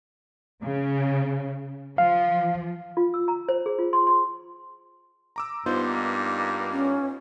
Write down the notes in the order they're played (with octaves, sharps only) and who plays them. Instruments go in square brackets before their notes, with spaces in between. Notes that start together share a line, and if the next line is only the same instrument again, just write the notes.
[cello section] C#3
[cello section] F3 [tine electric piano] F5
[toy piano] F4
E6
A#5
C5
G#4
F4
C6
C6
[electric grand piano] A#5 D6 E6
[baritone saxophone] G2 [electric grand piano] B3 D#4 F4 [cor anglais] C5
[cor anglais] A#3
[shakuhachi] C#4